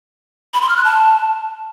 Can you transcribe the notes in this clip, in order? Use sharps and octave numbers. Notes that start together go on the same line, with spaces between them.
B5
C6
F6
F#6
A5